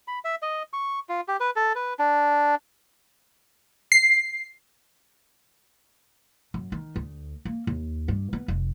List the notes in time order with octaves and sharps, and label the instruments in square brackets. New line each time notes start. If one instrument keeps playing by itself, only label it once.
[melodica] B5
E5
D#5
C#6
F4
G4
B4
A4
B4
D4
[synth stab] C7
[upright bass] F#2
D#3
D2
A#3
D#2
G2
B3
F1